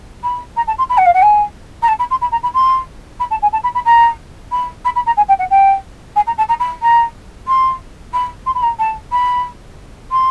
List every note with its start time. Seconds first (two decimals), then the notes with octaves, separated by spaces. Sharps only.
0.23 B5
0.56 A#5
0.67 A5
0.78 C6
0.89 B5
0.98 F#5
1.05 F5
1.14 F#5
1.22 G#5
1.82 A#5
1.88 A5
1.99 B5
2.10 C6
2.21 B5
2.32 A#5
2.43 B5
2.54 C6
3.20 B5
3.31 A5
3.42 G#5
3.53 A5
3.63 B5
3.75 B5
3.85 A#5
4.51 B5
4.85 B5
4.95 B5
5.06 A#5
5.17 G#5
5.28 G5
5.39 F#5
5.50 G5
6.16 G#5
6.27 A#5
6.38 A5
6.49 A#5
6.59 B5
6.82 A#5
7.48 C6
8.13 B5
8.46 C6
8.55 B5
8.63 A#5
8.79 A5
9.12 B5
10.11 C6